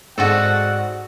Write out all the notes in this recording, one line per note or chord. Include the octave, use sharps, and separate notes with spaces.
G#2 A3 C4 F#4 A4 D5 F#5